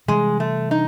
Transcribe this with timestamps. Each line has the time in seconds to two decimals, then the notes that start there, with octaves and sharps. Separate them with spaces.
0.08 C3 E3 G3 G#3
0.40 A3
0.71 D#4